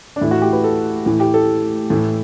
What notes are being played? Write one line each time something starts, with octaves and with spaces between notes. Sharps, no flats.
D4
A2 E3 E4
F#4
G4
B4
A4
A2 E3
G4
A4
A2 E3